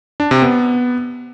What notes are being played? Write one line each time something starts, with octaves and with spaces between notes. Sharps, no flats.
D4
C3
B3